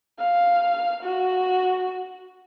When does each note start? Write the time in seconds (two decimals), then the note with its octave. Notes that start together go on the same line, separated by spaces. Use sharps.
0.19 F5
1.03 F#4